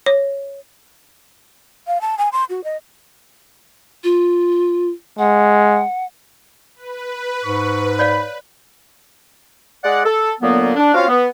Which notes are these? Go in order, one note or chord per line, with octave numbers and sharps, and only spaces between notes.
C#5
F5
A5
G#5
C6
F#4
D#5
F4
G#3 F#5
B4
G#2 C#6
C#5 D5 F5 B5
G#3 D5 F#5
A4
A#2 D3 F#3 A#3 B3
D4
C4 C#4 F4 F#4 F5
B3